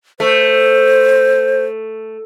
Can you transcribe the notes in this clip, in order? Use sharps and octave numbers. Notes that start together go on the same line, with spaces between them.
A3 C5